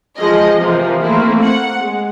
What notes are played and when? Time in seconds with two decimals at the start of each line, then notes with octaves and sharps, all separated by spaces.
0.17 E3 F3 G#3 D#5
0.59 C3 E3 F3 A#3
1.02 A3 A#3 C4 E4
1.40 F#5
1.78 G#3